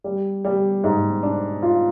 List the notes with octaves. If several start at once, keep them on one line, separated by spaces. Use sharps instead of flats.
G3
G3
G#2
D4
F4